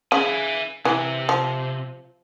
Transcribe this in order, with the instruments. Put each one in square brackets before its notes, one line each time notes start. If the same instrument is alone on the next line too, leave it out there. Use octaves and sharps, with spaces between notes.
[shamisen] C#3 [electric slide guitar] E5 G#5
[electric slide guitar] C3 [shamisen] E3
[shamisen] F3